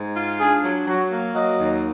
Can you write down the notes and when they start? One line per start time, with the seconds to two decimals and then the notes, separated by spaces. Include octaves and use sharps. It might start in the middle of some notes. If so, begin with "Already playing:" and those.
Already playing: G#2
0.16 F4
0.40 D4 G#4
0.64 F#3
0.87 F#3 F#4
1.12 A#3
1.35 F#3 D#5
1.58 D#2